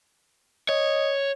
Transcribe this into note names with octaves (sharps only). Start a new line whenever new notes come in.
C#5 D#5